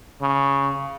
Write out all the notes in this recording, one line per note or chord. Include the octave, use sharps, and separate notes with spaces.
C#3